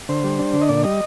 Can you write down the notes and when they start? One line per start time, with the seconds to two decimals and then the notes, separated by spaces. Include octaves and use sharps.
0.09 D3 C5
0.24 G3
0.39 D4
0.53 D3
0.61 D#5
0.69 A#2 D5
0.84 G3 D#5